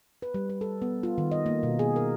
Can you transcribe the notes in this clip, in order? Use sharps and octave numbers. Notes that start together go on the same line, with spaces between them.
B4
G3
B4
A4
B3
F4
D#3
D#5
A#3
B2
G#4
A#4